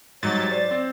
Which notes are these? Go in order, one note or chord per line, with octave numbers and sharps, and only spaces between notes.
G#2 F#3 G3 C#5 A6
C5 D5
C4 C5